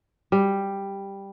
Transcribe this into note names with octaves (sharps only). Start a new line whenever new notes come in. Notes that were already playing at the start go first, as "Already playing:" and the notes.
G3